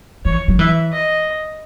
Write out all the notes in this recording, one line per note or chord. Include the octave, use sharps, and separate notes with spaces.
E3 C#5
F#3
E3 E5
D#5